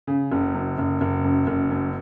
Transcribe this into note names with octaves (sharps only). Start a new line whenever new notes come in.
C#3
F#1
F#2
F#1
F#1
F#2
F#1
F#2